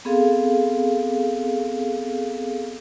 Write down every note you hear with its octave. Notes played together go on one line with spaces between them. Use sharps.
B3 C4 G#4 A4 F5